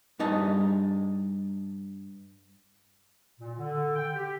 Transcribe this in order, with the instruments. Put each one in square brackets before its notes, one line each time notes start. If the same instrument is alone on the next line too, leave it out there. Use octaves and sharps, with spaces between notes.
[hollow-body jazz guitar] G2 D#4 D#5 A5
[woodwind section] A#2
D3
G5
G4